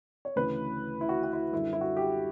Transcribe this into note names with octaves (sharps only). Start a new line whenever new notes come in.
C#5
D2 C#3 E3 B4
E4
F#4
F#4
E4
F#2 D3 G3 E4
E4
F#4
G4